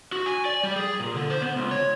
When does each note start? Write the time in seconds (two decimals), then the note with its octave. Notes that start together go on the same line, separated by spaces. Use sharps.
0.12 F#4
0.26 G#5
0.45 D5
0.63 G3
0.76 G#4
1.00 A#2
1.15 D3
1.30 C5
1.42 B3
1.56 C#2
1.71 C#5